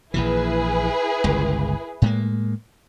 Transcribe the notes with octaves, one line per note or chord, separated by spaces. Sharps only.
A#1 A#2 E3 E4 G#4 B4
G1 C#2
A2 G#3 A#3